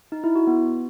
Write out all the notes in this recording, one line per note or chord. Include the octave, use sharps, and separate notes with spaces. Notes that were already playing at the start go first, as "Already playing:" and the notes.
D#4
E4
F#4
B3